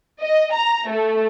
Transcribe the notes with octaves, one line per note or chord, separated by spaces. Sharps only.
D#5
A#5
A3